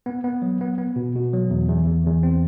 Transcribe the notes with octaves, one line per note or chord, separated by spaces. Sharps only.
B3
B3
F#3
B3
B3
B2
B2
F#3
E2
E2
E2
E2
C4